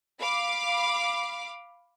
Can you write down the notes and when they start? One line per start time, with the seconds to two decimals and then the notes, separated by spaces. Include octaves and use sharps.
0.20 F5 B5 D6